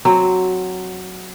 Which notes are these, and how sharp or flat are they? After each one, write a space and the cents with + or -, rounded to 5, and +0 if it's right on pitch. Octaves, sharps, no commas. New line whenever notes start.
F#3 +0 C4 +5